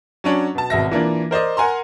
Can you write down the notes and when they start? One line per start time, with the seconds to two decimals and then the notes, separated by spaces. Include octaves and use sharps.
0.24 F#3 C#4 D4
0.55 B2 A5
0.70 G#1 B2 E5 A#6
0.91 E3 A#3 D4 F4
1.31 A#4 C5 D5 D#5
1.57 A#4 F#5 G#5 A#5 C6